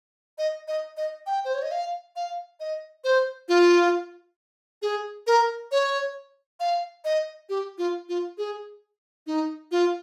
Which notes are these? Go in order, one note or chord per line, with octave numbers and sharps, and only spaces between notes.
D#5
D#5
D#5
G5
C5
C#5
D#5
F5
F5
D#5
C5
F4
G#4
A#4
C#5
F5
D#5
G4
F4
F4
G#4
D#4
F4